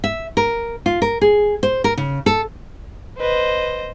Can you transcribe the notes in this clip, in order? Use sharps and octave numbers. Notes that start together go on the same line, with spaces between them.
E5
A#4
F4
A#4
G#4
C5
A#4
C#3
A4
B4 C5 D#5